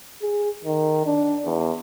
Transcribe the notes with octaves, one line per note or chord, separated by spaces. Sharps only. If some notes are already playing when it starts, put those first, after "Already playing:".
G#4
D#3
D4
E2